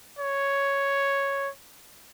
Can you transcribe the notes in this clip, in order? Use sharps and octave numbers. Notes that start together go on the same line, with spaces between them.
C#5